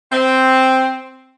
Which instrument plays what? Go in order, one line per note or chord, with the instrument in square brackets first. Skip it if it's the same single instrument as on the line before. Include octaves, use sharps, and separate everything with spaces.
[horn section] C4